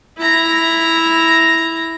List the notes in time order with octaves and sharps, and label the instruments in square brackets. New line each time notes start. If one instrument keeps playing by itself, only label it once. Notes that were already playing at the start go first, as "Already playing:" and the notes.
[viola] E4 A#5